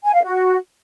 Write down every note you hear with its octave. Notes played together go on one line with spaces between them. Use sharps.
G#5
F5
F#4